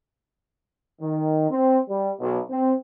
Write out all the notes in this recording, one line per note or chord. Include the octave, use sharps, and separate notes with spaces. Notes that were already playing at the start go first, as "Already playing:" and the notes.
D#3
C4
G3
B1
C4